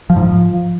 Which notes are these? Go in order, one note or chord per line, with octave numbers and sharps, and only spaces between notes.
F3
G#2
F3